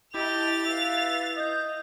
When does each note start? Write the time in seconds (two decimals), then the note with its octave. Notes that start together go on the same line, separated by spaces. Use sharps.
0.14 E4 G4 D#5 A5 A6 F7
0.66 B4 E5 F5
1.37 D#5 G6